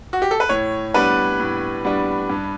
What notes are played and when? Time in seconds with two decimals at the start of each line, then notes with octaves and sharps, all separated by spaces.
0.13 F#4
0.22 G4
0.31 A4
0.40 B4
0.49 A2 C#5
0.94 G3 B3 D4 B4
1.40 A2
1.85 G3 B3 D4
2.29 G2